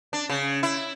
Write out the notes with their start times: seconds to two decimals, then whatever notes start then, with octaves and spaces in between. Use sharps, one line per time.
0.13 D4
0.30 C#3
0.63 E4